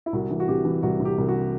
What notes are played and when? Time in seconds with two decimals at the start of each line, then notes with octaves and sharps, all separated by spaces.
0.06 E4
0.13 C2 F#4
0.31 E3
0.40 F#4
0.48 C3 G4
0.65 E3
0.83 C2 F#4
1.00 C3
1.05 G4
1.18 C2
1.28 F#4